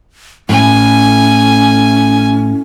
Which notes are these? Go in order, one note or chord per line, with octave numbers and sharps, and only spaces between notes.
A2 C#4 G#5